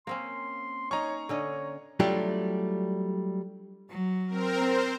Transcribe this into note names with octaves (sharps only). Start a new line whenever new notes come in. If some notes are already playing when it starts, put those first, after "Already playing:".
A#3 C4 C#4 C6
C#4 D#4 C#5 A#5 C#6
D3 C#4 C#5 D#5
F#3 G3 A3 D4 F4 G4
F#3
C4 A#4
C4 C5